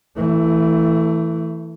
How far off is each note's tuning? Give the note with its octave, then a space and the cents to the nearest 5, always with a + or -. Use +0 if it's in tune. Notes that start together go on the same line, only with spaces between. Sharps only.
E3 -5 A3 +15